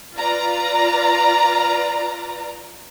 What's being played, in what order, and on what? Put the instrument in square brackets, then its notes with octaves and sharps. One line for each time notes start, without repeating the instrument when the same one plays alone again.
[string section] F4 B4 D5 A#5